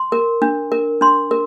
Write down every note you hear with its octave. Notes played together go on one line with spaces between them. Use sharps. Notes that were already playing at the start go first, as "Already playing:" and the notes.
Already playing: C6
A#4
D4
A#4
D4 C6
A#4